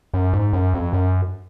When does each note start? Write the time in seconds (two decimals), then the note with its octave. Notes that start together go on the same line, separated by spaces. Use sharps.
0.14 F#2
0.33 G#2
0.53 F#2
0.74 F2
0.93 F#2